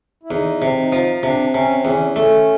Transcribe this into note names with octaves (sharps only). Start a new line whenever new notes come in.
E4
E2 D#4
C3
D#4
F3
C3 D4
C3 C#4
C4
E2 C#4
A3 C#4